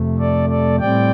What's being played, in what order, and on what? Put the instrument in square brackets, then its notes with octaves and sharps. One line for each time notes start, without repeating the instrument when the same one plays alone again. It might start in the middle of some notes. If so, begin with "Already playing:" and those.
Already playing: [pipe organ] F2 C3 A3
A4 D5
A4 D5
A2 G3 C4 D5 G5